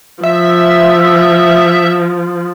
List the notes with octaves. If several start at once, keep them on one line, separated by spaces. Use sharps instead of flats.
F3 E5